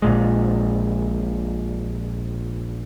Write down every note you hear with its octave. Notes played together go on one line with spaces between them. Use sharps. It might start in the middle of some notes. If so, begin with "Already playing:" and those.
A#1 A#2 G#3